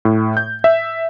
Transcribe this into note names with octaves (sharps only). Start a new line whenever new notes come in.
A2
G6
E5